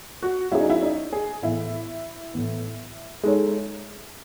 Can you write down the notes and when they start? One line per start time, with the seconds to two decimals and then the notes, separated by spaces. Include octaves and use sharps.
0.23 F#4
0.52 F#3 C#4 E4 G#4
0.61 D#4
0.70 E4
0.82 D#4
1.13 G#4
1.42 A2 E3 B3 E4
2.34 A2 E3 B3
3.23 G#3 D#4 A4 C#5